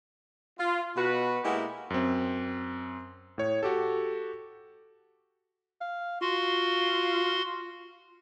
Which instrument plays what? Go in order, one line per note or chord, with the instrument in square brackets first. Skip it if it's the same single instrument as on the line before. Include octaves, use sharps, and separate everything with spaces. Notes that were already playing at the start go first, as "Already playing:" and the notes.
[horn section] F4
B2 F#4 B4
G#3 A#3 B3 E4 G4 A#4
[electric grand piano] F#2 C4
A2 C#5
F#4 G4 A4
[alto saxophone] F5
[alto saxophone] F4 [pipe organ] F#4 C6